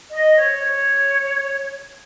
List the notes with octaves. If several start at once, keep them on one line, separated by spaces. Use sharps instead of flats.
D#5
C#5
C#5